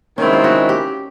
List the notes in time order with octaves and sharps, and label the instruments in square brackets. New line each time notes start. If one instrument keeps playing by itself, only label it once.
[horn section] D#3 G#3 C4 E4 [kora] C#4
[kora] F4
F#4
G4